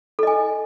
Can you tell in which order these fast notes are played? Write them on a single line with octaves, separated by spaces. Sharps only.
A4 D#5 G#5